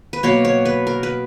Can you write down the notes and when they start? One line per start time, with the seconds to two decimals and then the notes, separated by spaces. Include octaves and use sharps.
0.13 B4
0.23 B2 F#3 A#3 C#5
0.45 C#5
0.65 B4
0.87 A#4
1.03 B4